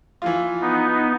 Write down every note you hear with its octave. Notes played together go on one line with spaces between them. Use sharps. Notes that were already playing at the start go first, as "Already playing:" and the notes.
E3 F3 F4
B3 D#4